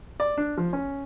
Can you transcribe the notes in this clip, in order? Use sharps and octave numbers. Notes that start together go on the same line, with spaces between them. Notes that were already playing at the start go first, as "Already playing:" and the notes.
D5
D4
F3
C#4